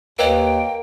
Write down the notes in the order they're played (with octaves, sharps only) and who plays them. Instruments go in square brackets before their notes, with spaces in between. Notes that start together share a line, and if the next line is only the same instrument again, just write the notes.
[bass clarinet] D#2 [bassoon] A#3 [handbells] B4 C#5 D#5 [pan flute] G5